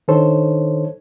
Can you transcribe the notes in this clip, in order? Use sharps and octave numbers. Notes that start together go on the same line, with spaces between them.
D#3 D4 D#4 A4 C5 C#5